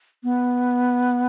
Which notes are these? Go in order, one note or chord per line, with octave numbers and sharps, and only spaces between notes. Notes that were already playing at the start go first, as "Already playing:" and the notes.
B3